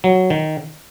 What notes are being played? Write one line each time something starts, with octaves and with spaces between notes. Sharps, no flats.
F#3
D#3